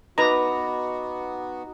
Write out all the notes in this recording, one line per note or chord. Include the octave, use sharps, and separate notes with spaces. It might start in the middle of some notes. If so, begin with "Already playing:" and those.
B3 D#4 F#4 B4 A#5 B5 D6